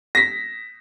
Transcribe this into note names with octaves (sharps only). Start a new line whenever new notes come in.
A#6 B6